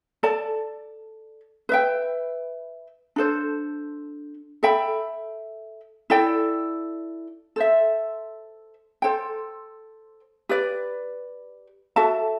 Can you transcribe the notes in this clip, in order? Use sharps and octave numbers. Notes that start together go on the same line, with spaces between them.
A4 D5 A5
B4 E5 G5
D4 A4 C5
A4 E5 G5 B5
E4 A4 D5 G5
A4 C5 E5
A4 C5 G5
G4 B4 D5
F#4 A4 E5 A5